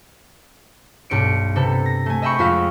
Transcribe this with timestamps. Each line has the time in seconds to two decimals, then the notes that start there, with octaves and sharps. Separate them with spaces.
1.10 B1 G2 C#7 D7
1.56 C3 B3 A4
1.86 A#6
2.06 A3 G#5
2.22 D#5 E5 G5 B5 C#6
2.39 F2 G#3 F4 F#4 F5 B6